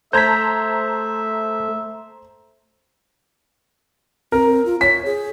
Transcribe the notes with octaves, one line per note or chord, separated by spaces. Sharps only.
A3 C5 E5 A5 A#5 G6 G#6 B6
C4 A#4
F4
C#5 B6
G#4